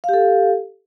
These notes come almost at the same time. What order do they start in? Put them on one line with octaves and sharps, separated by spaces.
F5 G4 A4